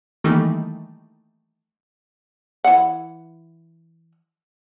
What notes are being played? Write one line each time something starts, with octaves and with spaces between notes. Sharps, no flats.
D#3 E3 G3 A3 A#3 D#4
E3 F#5